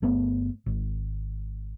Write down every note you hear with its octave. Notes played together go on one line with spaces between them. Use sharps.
G1 A3 B3
G#1